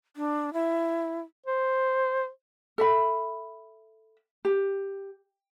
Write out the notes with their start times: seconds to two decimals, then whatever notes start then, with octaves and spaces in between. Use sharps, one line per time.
0.17 D4
0.53 E4
1.46 C5
2.78 A4 E5 B5
4.45 G4